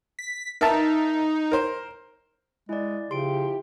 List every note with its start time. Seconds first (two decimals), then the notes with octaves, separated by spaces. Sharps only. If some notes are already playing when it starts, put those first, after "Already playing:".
0.19 B6
0.61 D#4 A#4 E5 A5
1.52 A#4 C5
2.69 G#3 E4 D5
3.11 C#3 F3 E4 G4 C6 D7